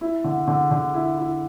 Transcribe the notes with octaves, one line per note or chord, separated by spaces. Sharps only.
E4
D3
D3
D3
E4
E4